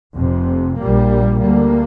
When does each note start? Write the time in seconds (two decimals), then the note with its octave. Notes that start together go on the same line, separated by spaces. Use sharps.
0.15 F1 F2 C3
0.79 A#1 A#2 G3 A#3
1.43 D2 D3 G3 A#3